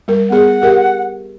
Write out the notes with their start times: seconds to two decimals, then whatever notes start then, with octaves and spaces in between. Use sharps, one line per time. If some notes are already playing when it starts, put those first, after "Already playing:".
0.08 G3 A#4
0.30 B3 G#4 F#5
0.62 G4 A#4 E5